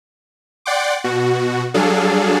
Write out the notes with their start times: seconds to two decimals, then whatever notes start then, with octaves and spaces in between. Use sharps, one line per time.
0.66 D5 F#5 G5 C6 D6
1.04 B2 F#4
1.74 F#3 G3 D4 G#4 A4 F5